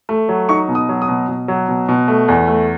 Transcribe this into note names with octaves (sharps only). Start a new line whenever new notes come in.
A3
F#3
D#4 C#6
B2
D#6
F#3
D#6
B2
B2
F#3
B2
B2
A3
E2
A3